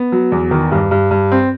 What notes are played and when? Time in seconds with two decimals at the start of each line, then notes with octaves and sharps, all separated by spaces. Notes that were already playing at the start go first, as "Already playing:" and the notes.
Already playing: B3
0.12 F#3
0.32 E2
0.51 D#3
0.72 G2
0.91 G2
1.11 G2
1.32 C4